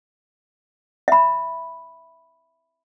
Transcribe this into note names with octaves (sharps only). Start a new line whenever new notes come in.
E5 B5